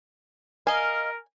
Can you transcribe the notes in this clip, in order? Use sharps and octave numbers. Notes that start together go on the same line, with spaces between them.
A#4 D#5 F5 G#5